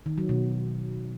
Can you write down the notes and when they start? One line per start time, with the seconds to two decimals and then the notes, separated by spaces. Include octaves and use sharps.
0.06 D#3
0.18 F#3
0.29 B2